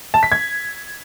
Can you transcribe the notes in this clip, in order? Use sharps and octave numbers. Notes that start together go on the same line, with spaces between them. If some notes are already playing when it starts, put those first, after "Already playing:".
A5
B6
G#6